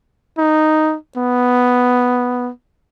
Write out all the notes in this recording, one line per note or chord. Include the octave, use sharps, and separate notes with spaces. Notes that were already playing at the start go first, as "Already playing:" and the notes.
D#4
B3